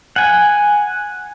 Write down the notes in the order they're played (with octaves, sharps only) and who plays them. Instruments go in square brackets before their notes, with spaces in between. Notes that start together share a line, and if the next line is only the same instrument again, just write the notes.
[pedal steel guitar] F#5 G#5